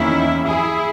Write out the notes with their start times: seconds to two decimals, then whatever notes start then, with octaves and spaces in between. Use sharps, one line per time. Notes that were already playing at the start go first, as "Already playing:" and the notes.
Already playing: E2 D#3 A#3 C#4 E4
0.46 E4 G#4